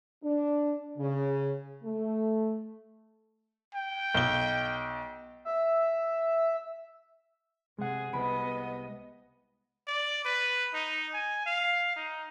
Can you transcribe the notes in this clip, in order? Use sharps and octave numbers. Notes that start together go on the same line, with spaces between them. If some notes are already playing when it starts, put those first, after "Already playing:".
D4
C#3
A3
G5
B1 G7
E5
C3 G#3 G#4 F#5
C2 B3 B4 D#5 B5 D7
D5
B4
D#4
G#5
F5
D#4